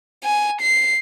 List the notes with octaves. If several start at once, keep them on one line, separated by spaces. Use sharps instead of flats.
G#5
C7